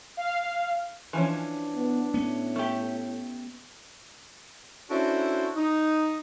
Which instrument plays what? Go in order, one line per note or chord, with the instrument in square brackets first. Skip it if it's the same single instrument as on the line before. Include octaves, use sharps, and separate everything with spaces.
[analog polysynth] F5
[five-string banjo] E3 F3 C#4 [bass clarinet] D4
[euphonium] B3
[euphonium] A2 [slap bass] B3 C#4
[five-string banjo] A3 G4
[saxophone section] C#4 D4 E4 F#4 A4 C5
D#4